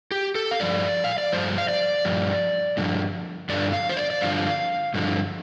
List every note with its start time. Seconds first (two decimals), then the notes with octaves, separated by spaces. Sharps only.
0.11 G4
0.35 A4
0.51 F5
0.60 G2 F3 D5
1.04 F5
1.18 D5
1.32 G2 F3 C5
1.58 F5
1.69 D5
2.05 G2 F3
2.77 G2 D3 F3
3.49 G2 D3 F3 D5
3.73 F5
3.89 C5
3.97 D5
4.10 D5
4.21 G2 D3 F3 F5
4.94 G2 D3 F3